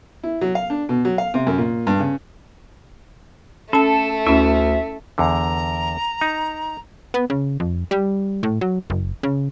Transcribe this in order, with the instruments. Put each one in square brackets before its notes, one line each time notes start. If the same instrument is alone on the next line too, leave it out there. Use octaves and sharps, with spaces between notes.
[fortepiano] E4
F#3
F5
D4
B2
F#3
F5
C3
F#2
A#2
G2
C#3
[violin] A3 [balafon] C#4 A5 [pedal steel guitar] A4
[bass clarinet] D2 [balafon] C#4 E4 [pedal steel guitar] E5
[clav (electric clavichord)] E2 D3 [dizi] A#5
[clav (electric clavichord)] D#4
[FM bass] B3
C#3
F2
G3
A2
F#3
F#1
C#3